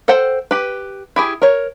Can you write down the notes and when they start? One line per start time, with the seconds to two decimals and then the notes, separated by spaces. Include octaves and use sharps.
0.08 A4 C5 F#5 G5
0.51 G4 B4
1.16 E4 G4 G#4
1.42 A#4 C#5